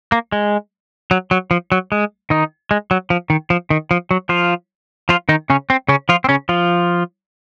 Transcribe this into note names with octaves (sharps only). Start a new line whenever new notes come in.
A#3
G#3
F#3
F#3
F3
F#3
G#3
D#3 D#4
G#3
F#3
F3
D#3
F3
D#3
F3
F#3
F3 F4
F3 F4
D#3 D#4
C#3 C#4
C4
C#3 C#4
F3 F4
C4
C#3 C#4
F3 F4